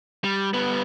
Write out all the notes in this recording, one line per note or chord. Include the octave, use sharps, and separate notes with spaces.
G3
G3 B3